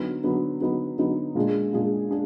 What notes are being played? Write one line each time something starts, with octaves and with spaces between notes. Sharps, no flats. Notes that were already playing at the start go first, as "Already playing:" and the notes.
Already playing: D3 F#3 B3 D#4
D3 F#3 B3 D#4
D3 F#3 B3 D#4
D3 F#3 B3 D#4
A#2 G#3 D4 G#4
A#2 G#3 D4 G#4
D4 G#4